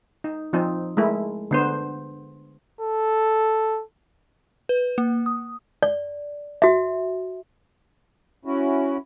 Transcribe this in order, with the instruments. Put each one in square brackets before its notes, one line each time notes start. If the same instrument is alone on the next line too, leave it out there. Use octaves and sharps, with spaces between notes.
[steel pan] D#4
F3 C4 D#4
G#3 A3 E4 A#4
D3 B3 C5
[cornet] A4
[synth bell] B4
A#3
D#6
[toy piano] D5
F#4 E5
[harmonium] C#4 E4 F#4